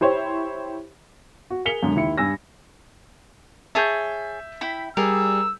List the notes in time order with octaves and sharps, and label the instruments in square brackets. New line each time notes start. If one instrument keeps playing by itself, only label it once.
[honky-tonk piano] E4 G4 C5 C#5
[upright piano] F#4
G#4 A#4 B6 C#7 F7 G7
F#2 D3 G#3
D#2 E4 C#7
G2 G#5 E6 A#6
[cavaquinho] G#4 C#5 A5 [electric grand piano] E5 G6
[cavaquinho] E4 G5 B5
[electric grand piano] G3 G#4 [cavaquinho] A#4 [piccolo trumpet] E6